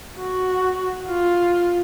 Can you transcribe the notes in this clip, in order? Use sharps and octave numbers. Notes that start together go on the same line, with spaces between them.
F#4
F4